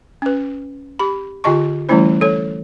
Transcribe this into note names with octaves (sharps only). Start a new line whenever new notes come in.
C#4 B4
G4 B5
D3 F4 G4 D#5 A5 C#6
E3 G3 A3 C#4 E4 C5
A4 C#5